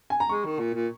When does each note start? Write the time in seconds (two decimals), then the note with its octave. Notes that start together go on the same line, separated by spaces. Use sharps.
0.10 G#5
0.20 A#5
0.29 G#3 C#6
0.45 D#3
0.59 A#2
0.74 A#2